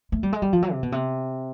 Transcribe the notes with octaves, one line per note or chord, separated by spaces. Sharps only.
A3
G3
G#3
G3
F3
F#3
C3
B2
C3